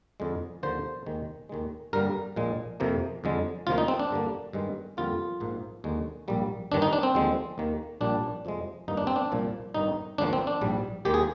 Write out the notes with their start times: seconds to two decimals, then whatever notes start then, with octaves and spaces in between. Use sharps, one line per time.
0.20 F2 D3 G#3
0.63 D#2 D3 F3 A#3 C5
1.06 D#2 D#3 G#3
1.49 D#2 D#3 G#3
1.93 G2 D3 G3 A#3 A#4
2.36 A#1 A#2 F3 G#3
2.80 F2 C3 F3 A#3
3.24 F2 D3 G#3
3.67 D2 C3 F3 A#3 F4
3.78 D#4
3.88 C4
3.99 D4
4.11 G2 D3 G3 A#3
4.53 G2 D#3 G#3
4.97 F2 D3 G3 A#3 F4
5.40 A#1 G#2 F3 A#3
5.84 D#2 D3 G#3
6.28 A#1 G#2 G3 A#3
6.71 G1 G2 D#3 D4
6.82 D#4
6.93 D4
7.03 C4
7.15 D#2 D3 F3 G#3
7.58 D#2 D#3 A#3
8.01 A#1 A#2 G3 D4
8.45 F2 C3 F3 G#3
8.88 G#1 G2 F3 A#3 D#4
8.97 D4
9.07 C4
9.16 D4
9.32 C2 A#2 F3 A#3
9.74 G#1 G2 D#3 G3 D#4
10.18 G#1 G#2 F3 A#3 D4
10.33 C4
10.47 D4
10.61 A#1 G#2 G3
11.05 D#2 D#3 G#3 G4
11.14 G#4